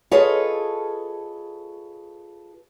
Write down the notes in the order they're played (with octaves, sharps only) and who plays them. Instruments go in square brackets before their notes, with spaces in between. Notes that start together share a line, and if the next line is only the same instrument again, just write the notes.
[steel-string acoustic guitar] F4 G#4 A4 B4 C#5 D#5